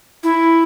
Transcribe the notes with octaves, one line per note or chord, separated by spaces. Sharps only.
E4